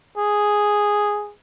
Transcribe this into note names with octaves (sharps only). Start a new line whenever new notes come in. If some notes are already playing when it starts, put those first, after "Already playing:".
G#4